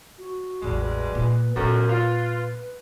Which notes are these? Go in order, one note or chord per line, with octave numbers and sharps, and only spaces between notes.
F#4
A1 E2 B2 G3 G#3
B4
A#2
F#2 A#2 B3 A4
F4 B4